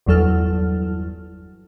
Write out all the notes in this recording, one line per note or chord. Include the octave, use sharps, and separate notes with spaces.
G1 E2 F#3 A4 F6